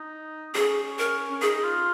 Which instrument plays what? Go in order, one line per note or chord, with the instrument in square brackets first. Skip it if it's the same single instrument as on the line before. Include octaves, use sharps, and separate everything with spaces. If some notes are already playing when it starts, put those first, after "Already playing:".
Already playing: [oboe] D#4
[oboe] C#4 [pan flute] G#4
[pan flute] A#4
[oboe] C#4
[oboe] D#4 [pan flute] G#4
[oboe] F4